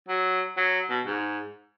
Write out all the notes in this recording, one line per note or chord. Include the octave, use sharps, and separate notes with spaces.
F#3
F#3
B2
G#2